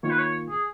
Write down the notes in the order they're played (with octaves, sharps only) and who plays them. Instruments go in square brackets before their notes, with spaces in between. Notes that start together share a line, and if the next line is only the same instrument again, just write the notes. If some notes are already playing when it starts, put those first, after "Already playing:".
[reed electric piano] D#3 A#3 F4 [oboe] C#5
[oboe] B4
C#5
G#4